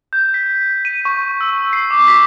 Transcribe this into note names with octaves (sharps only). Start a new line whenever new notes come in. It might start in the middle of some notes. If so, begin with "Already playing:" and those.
G6
B6
D#7
C#6
E6
C7
D6
B6